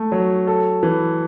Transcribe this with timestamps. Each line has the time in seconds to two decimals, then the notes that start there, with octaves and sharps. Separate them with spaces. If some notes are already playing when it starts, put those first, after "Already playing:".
Already playing: A3
0.12 F#3
0.47 A4
0.83 E3